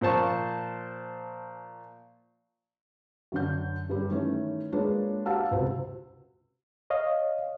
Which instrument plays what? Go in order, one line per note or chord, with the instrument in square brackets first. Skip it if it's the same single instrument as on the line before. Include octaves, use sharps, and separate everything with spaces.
[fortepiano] A#2 F3 C5 A5 C#6
[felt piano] F#2 D3 G6
G2 G3
D#3 E3 A3 C#4
G#3 A#3 D4 F4 B4 C#5
F#4 G4 F5 F#5 A5 E6
C#2 C3 F#4 C5
[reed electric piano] C#5 D#5 F5